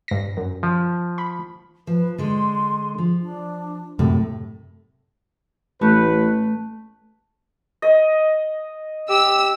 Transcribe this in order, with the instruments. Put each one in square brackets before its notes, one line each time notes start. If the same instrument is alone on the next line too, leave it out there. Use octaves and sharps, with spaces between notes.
[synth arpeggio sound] G2 A#6
F#2
[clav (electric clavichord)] F3
[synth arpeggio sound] B5
[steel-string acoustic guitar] F3 [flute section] B4
[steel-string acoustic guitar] D3 G#3 [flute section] C6
[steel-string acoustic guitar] F3
[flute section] D4
[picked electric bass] F#2 C3 [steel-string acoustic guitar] A2
[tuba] A1 [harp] A3 [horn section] B4
[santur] D#5
[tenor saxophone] G4 [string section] E6